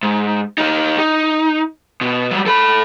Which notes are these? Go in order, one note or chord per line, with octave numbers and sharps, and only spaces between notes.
G#2
D#4 G4
D#4
B2
F#3 G3
A4 B5